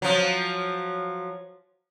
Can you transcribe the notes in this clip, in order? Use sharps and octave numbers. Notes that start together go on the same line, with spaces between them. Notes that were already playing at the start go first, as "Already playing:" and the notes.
F3 F#3